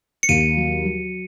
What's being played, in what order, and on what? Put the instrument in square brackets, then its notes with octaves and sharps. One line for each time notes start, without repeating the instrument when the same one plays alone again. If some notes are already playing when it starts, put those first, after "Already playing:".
[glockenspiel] C#7
[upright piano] D#2 [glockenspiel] D#7
[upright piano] F#3
F#3